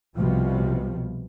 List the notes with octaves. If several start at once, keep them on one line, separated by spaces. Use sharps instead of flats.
C2 B2 F3 G3